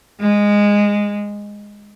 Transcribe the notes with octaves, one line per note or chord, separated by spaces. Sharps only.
G#3